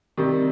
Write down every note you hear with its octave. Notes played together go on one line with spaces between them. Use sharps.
C3 D#3 G3